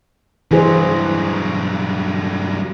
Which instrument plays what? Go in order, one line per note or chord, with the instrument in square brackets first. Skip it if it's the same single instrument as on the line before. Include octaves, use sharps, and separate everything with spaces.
[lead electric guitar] G2 F#3 [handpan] E3 G#4 C5